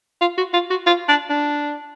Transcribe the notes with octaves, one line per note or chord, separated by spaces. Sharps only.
F4
F#4
F4
F#4
F4
D4
D4